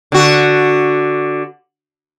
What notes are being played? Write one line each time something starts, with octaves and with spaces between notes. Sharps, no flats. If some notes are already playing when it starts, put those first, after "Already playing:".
D3 F#4